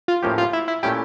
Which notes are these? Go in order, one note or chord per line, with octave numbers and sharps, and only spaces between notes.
F4
A2 F3 A#3 C#4 G4
F4
E4
E4
A#2 A3 C#4 E4 G4